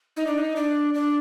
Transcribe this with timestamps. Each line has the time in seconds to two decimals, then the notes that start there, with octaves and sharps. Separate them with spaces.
0.17 D#4
0.27 D4
0.38 D#4
0.56 D4
0.94 D4